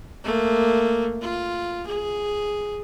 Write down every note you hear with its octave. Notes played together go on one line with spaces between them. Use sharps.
A3 A#3
F4
G#4